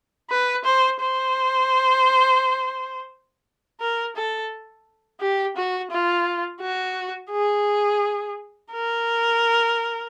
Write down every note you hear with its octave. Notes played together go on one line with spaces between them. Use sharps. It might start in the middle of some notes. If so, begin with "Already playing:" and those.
B4
C5
C5
A#4
A4
G4
F#4
F4
F#4
G#4
A#4